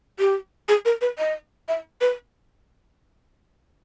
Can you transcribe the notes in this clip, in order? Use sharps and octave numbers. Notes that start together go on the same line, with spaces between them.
G4
G#4
A#4
B4
D#5
E5
B4